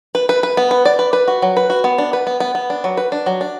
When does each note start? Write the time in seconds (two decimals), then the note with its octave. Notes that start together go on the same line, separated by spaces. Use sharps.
0.15 B4
0.29 B4
0.43 B4
0.57 B3
0.71 B4
0.85 D5
0.99 B4
1.13 B4
1.28 F#4
1.42 F#3
1.57 B4
1.70 F#4
1.84 B3
1.98 D4
2.13 B4
2.27 B3
2.40 B3
2.55 B3
2.70 D4
2.84 F#3
2.97 B4
3.12 D4
3.26 F#3
3.41 D4